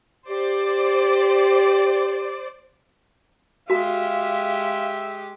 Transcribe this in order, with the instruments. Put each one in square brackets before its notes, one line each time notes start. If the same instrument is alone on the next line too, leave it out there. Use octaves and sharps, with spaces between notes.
[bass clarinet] G4 [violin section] C5 D5
[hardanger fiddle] G#3 G4 [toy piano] F#4 A#5 [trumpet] E5 [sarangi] F5